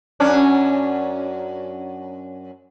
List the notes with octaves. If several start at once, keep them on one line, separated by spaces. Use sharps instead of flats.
F#2 C#4 D4